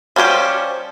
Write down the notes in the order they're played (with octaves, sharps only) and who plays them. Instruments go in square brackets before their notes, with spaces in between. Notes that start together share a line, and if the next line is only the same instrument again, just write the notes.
[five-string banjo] F3 G3 C#4 G4 C5